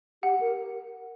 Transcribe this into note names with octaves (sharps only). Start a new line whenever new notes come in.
G4 F#5
A#4